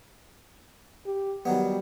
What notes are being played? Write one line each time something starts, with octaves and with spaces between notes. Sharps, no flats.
G4
D#3 F#3 G3 B3